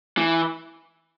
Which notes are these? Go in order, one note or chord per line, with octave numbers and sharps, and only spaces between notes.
E3